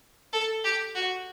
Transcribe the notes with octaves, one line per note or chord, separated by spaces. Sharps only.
A4
G4
F#4